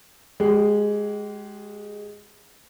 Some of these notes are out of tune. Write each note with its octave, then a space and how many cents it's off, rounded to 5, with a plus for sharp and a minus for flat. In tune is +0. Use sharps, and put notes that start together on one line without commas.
G#3 +0 G4 -35